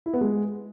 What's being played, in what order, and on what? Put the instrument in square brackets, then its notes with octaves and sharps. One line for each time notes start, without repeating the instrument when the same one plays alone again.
[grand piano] E4
B3
G#3